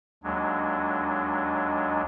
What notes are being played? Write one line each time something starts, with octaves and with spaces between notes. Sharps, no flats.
D#2 F#3 G#3 D4